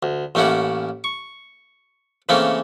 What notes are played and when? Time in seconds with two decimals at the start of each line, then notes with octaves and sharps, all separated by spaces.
0.03 D2
0.35 A1 A3 A#3 C#4 E4 F#5
1.04 C#6
2.29 C#3 E3 A3 A#3 C4 C#4